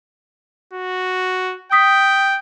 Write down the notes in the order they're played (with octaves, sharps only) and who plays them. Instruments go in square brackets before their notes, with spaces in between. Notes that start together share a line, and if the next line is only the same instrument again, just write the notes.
[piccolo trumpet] F#4
[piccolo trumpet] G5 [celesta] D#6 B6